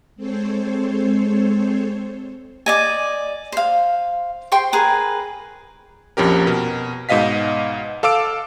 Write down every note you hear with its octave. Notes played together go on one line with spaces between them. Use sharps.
G#3 C4 A4 C5 C#5
D5 D#5 G#5
C5 F5
C5 G5 C6 C#6
G#4 A#4 B4
A#1 F2 C#4 G4 A#4
B2 A#4
G#2 B2 D#5 F5 B6
A4 F5 D6 E6 D7